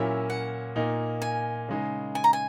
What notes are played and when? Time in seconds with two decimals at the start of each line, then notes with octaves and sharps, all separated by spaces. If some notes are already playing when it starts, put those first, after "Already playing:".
Already playing: A#2 F#3 A#3 C#4 E4 E5
0.30 F#5
0.76 A#2 A#3 D#4
1.22 G#5
1.69 C#3 G#3 D#4
2.15 G#5
2.24 A#5
2.33 G#5